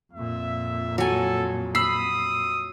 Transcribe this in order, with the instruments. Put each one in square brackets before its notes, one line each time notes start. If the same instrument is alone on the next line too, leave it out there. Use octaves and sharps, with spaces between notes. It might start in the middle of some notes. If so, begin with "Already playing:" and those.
[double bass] F2 A#2 [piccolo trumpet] E5
[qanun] F#3 G#5 [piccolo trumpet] A4
[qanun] B5 [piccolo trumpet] D#6 [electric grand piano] E6 C7